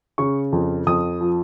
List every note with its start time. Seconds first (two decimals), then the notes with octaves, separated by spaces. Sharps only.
0.18 C#3 C#6
0.52 F2
0.87 F2 D#6
1.21 F3